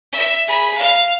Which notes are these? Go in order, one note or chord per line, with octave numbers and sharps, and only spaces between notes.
E5
G#4 B5
F5